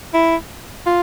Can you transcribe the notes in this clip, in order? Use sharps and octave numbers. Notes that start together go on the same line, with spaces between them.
E4
F4